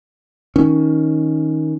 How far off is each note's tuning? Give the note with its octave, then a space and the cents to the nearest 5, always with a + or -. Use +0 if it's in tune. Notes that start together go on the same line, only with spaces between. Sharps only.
D#3 +10 C#4 +0